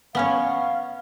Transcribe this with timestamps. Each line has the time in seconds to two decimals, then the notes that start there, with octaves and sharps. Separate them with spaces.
0.15 B3 C#4 C#5 F5